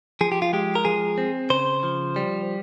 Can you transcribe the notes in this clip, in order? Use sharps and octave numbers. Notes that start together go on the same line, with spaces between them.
F3 G#4
G4
F4
G#3 G4
A#4
F3 G#4
C4
C#3 C5
F3
G3